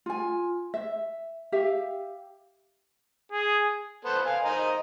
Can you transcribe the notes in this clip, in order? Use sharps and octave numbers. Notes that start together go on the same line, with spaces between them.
F4 G#5
E5
G4 E5 F5
G#4
B3 A4 C5
F5 G#5
A#4 C5 D#5